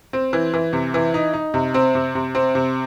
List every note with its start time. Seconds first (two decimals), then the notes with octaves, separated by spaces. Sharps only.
0.13 C4
0.33 E3
0.54 E3
0.73 C3
0.94 E3
1.14 D#4
1.33 D#4
1.54 C3
1.74 C4
1.95 C3
2.15 C3
2.35 C4
2.55 C3